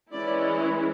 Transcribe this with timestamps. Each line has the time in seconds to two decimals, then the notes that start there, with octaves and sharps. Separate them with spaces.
0.12 E3 G#3 C#4 E4 D5